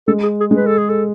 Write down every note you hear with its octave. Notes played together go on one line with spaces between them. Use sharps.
G#3 A4
G#4
G#4
G#3
B4
A4
G#4
A4